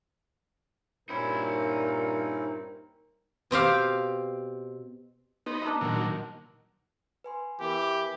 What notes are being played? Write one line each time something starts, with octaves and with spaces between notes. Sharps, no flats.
G2 A#2 C4 C#4 D#4 E4 A#4 B5
B2 C4 G4 F5
B3 D#4 C5
D4 A#5 E6
A#2 D#3 F#3
B4 G#5 C6
E3 B3 G4 A#4 B4